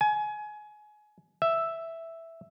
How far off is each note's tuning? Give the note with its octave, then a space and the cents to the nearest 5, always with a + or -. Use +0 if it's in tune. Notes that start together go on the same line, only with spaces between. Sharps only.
G#5 +25
E5 +0